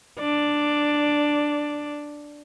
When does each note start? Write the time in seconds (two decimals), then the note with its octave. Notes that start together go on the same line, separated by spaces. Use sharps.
0.20 D4 D5